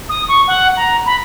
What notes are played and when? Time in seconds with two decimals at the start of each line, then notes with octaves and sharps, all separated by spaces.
0.09 D#6
0.28 C#6
0.47 F#5
0.76 A#5
1.05 B5